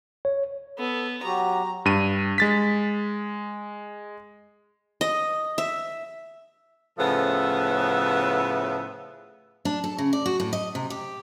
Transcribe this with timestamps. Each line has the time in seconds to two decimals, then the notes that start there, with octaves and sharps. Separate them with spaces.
0.25 C#5
0.78 B3 A4
1.24 F#3 F#4 G4 A#5
1.85 G2 D#7
2.38 G#3 A6 B6
5.01 D#5
5.58 E5
6.99 A2 C#3 F3 B3 A4 E5
9.65 D4
9.84 A4
9.98 C#3
10.13 D5
10.26 F#4
10.40 A2
10.53 D#5
10.75 C3
10.90 G4